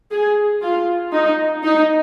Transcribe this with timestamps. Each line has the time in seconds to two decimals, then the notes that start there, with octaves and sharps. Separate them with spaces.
0.11 G#4
0.62 F4
1.12 D#4
1.63 D#4